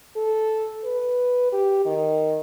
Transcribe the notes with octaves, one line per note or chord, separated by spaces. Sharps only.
A4
B4
G4
D#3